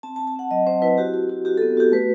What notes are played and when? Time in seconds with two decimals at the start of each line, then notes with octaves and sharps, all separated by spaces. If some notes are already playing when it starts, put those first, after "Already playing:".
0.03 C4 A5
0.16 A5
0.19 C4
0.27 A5
0.36 C4 F#5
0.51 F#3 D#5
0.67 C4 C5
0.82 E4 B4
0.98 F#4 G4
1.14 F#4
1.30 F#4
1.45 F#4 G4
1.57 B3 A4
1.77 F#4 G4
1.92 A3 B4